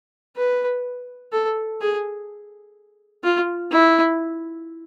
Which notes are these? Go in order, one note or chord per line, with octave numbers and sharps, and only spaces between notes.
B4
A4
G#4
F4
E4